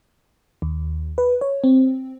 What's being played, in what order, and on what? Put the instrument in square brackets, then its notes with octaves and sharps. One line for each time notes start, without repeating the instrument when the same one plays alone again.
[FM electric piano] D#2
B4
C#5
C4